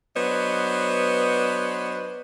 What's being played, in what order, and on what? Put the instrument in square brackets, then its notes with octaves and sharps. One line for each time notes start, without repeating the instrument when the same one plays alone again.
[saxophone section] F#3 B3 D4 C5 C#5 D#5